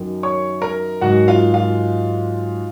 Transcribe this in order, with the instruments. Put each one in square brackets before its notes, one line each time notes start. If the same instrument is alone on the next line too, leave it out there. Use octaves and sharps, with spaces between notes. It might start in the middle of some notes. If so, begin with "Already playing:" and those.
Already playing: [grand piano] F#2 D#3 F#3
C#5 C#6
A#4 A#5
G#2 D#3 F#3 F#4 F#5
F4 F5
F4 F5